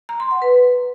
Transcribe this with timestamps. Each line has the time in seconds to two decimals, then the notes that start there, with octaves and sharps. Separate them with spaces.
0.09 A#5
0.20 C6
0.31 F#5
0.42 B4